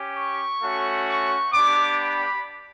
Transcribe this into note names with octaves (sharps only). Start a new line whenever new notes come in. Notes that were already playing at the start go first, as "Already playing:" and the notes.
Already playing: C#4 G4
C#6
A3 C#4 F#4
C#6
B3 D4 G4 D6
B5